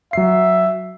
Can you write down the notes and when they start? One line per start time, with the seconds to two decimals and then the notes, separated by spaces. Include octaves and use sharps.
0.13 F#3 E5 C7